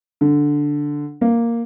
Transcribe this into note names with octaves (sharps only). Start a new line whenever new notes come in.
D3
A#3